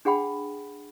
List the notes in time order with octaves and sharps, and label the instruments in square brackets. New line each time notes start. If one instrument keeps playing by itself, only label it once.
[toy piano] D4 G#4 F#5 G5 B5